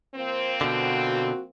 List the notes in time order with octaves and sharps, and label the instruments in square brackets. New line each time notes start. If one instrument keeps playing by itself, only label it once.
[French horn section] F3 A#3 C4 [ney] C5
[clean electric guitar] B2 D3 [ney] F#4